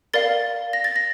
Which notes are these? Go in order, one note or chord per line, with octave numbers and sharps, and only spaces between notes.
A#4 D5 F5 A6
A#6
A6
A#6